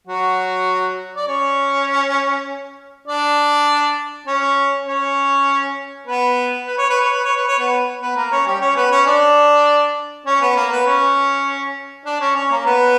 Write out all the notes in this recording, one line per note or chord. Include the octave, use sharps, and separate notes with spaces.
F#3 F#4
D5
C#4 C#5
D4 D5
C#4 C#5
C#4 C#5
B3 B4
B4
C#5
B4
C#5
B4
C#5
B4
C#5
B3 B4
B3 B4
A#3 A#4
C#4 C#5
G3 G4
C#4 C#5
B3 B4
C#4 C#5
D4 D5
C#4 C#5
B3 B4
A#3 A#4
B3 B4
C#4 C#5
D4 D5
C#4 C#5
C#4 C#5
A#3 A#4
B3 B4